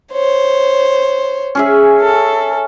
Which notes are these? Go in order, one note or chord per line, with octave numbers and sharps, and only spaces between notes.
C5 C#5
C#4 G#4 E5
A4